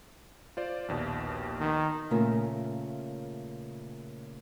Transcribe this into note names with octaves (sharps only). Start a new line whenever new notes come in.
F4 C5 D5
A#1 D#2 B2
D#3
A#2 C#3 A3 F4 A#4 E5